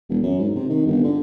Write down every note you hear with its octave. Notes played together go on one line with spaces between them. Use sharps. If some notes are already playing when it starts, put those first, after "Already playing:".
E1
F#2
G#2
C3
D#3
G1
D3